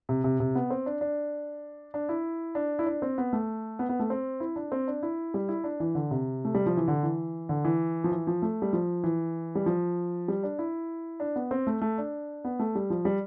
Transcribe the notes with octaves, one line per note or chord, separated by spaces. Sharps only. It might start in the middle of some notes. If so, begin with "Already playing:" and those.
C3
C3
C3
B3
C4
D4
D4
D4
E4
D4
E4
D4
C4
B3
A3
B3
B3
A3
C4
E4
D4
C4
D4
E4
G3
E4
D4
E3
D3
C3
A3
G3
F3
E3
D3
E3
D3
E3
F3
E3
F3
A3
G3
F3
E3
G3
F3
G3
D4
E4
D4
B3
C4
A3
A3
D4
B3
A3
G3
F3
G3